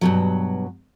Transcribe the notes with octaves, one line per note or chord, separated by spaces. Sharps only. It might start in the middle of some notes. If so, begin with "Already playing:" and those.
G2 B2 F#3